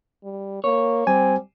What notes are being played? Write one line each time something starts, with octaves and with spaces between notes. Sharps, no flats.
G3
A#3 C#5
G3 C4 G#5